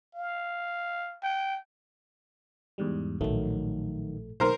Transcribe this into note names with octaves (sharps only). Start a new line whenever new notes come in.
F5
G5
E2 G#2 G3
A#1 A2 D#3 F#3 A3
B1 D#3 A#4 C5